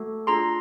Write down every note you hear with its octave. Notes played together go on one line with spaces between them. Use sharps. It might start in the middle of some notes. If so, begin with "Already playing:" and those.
Already playing: A3 F#4 A4
D4 F4 G#4 A#5 C6